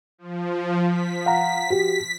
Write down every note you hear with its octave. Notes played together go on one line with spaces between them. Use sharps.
F3
B6
F5 F#5 A#5
F#4 G4